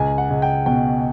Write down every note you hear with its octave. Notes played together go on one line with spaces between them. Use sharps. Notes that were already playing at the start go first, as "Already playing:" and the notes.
Already playing: C#2 G#5
F#5
C#2
G5
B2 G5